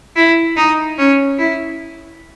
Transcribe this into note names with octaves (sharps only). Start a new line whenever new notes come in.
E4
D#4
C#4
E4